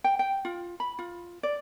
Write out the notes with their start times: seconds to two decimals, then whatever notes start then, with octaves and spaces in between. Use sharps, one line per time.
0.04 G5
0.19 G5
0.45 F4
0.80 B5
0.99 F4
1.43 D5